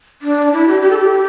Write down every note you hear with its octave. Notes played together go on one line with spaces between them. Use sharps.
D4
E4
G4
G4
A4
G4